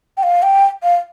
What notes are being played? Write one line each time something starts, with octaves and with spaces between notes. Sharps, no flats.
G5
F5
G5
F5